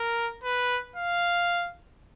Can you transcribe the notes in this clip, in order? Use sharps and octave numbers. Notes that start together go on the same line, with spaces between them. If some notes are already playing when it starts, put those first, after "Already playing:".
Already playing: A#4
B4
F5